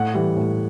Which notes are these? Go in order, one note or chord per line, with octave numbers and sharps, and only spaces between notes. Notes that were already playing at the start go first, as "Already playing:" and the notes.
Already playing: A2 F#5
E3 G3
A2